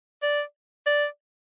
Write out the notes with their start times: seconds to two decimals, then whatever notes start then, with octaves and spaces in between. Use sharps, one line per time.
0.23 D5
0.87 D5